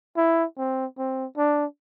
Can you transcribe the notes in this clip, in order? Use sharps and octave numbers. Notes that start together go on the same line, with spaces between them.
E4
C4
C4
D4